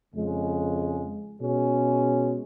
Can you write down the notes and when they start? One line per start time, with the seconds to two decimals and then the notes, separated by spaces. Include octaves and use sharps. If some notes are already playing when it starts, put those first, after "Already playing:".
0.13 F2 C#3 G#3
1.37 B2 G#3 C#4 G#4